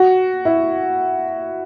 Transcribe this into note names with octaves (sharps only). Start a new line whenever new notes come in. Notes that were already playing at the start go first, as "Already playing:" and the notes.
Already playing: F#4
E4